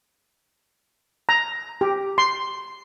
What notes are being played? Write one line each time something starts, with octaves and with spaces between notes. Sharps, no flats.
A#5
G4
C6